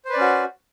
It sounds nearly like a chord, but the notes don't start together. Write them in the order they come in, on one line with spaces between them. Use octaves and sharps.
C5 B4 D5 C#4 F#4